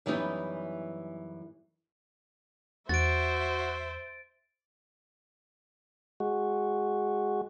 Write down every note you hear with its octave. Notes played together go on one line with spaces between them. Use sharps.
F#2 E3 G3 B3 D#4 E4
E2 F#4 C5 E5 A6 D7
G#3 F#4